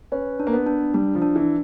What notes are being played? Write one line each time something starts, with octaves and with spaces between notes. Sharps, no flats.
C#4 B4
D4
A#3
B3
D4
G3 D4
F3
D4
E3